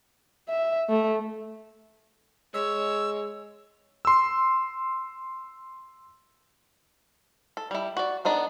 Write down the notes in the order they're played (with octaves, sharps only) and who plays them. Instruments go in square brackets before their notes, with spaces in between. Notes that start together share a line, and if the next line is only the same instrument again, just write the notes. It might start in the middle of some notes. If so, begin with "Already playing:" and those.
[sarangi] E5
A3
[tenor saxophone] G#3 [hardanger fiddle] C#5 [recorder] E6
[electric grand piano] C6 E6
[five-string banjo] A4
G3 E4
F#4 D5
B3 D4 D#4 A4